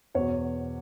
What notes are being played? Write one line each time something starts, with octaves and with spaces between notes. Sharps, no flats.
E2 B2 C#5